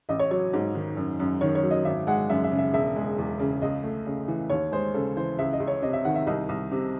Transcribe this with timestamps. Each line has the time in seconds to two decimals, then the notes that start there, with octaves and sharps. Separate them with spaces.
0.09 A1 D#5
0.19 C#5
0.31 F#3 C#5
0.53 G#2
0.75 D#3
0.97 F#2
1.20 F#2
1.41 D#3 C#5
1.55 C#5
1.63 F#3
1.71 D#5
1.85 G#1 E5
2.07 G#3 F#5
2.30 F#2 E5
2.44 E5
2.51 C#3
2.58 E5
2.74 E1 E5
2.96 G#3
3.18 E2
3.39 C#3
3.62 C#2 D#5
3.83 A3
4.06 C#3
4.28 E3
4.50 D#2 C#5
4.72 G#3 C5
4.94 C#3 A4
5.16 E3 C5
5.39 C#2 E5
5.53 D#5
5.60 C#2
5.67 C#5
5.82 C3 D#5
5.93 E5
6.05 D#3 F#5
6.16 E5
6.27 C2 D#5
6.49 C2
6.72 C3